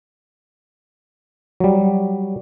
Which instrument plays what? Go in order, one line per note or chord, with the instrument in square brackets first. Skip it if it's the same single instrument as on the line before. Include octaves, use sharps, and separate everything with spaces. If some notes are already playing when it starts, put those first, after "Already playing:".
[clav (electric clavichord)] F#3 G3